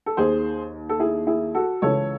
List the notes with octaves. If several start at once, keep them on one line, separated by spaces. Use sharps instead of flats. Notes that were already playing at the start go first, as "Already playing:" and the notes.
A4
D#2 D#3 G#4 C5
A4
E4 G#4
E4 G#4
F#4 A4
C#2 C#3 E3 A4 C#5